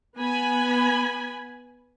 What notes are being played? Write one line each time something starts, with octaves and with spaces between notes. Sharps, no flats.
B3 G#5 B5